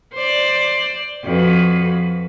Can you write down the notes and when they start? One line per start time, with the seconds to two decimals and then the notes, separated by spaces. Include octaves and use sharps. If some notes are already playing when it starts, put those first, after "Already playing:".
0.13 C5 D5
1.24 F2 F#4 B4